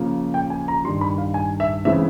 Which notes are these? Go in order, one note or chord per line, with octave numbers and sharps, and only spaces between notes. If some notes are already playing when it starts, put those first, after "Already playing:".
Already playing: C#3 F3 A#3
G5
G#5
A#5
G2 D#3 G3 C6
B5
F5
G#5
E5
C#3 E3 G#3 C4 E5